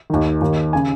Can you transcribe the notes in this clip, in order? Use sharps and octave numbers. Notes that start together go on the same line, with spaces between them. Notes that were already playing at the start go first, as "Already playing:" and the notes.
D#2 D#3
D#2 D#3
C#3 G#5